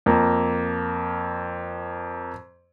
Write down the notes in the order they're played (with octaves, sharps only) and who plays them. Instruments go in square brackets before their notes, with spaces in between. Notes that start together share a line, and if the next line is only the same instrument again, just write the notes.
[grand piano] F2 A#3